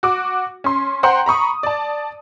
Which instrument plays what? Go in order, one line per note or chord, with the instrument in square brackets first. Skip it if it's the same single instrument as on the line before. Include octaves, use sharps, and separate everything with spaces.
[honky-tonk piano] F#4 D6
C#4 C6
C5 F#5 G5 A#5 C6
A#5 B5 C#6 D#6
D5 A5